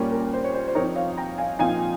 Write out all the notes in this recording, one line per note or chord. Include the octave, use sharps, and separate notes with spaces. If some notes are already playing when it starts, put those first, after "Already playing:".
Already playing: A#2 G3 A#3 C#4
A#4
C5
C#5
C5
C5
F3 C4 D#4 A#4 C#5
C#5 F5
G5 A#5
F5 G#5
A#2 F3 C4 D#4 F5 G#5